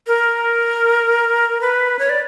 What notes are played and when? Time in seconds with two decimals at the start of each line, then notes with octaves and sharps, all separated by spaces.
0.07 A#4
1.61 B4
1.99 C#5
2.09 D5